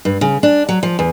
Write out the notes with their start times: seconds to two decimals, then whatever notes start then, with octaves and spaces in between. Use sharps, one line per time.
0.05 G2
0.21 C#3
0.43 D4
0.69 F#3
0.83 F3
0.99 E2